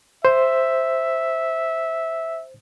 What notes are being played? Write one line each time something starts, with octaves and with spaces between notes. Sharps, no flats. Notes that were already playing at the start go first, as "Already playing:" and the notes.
C5 E5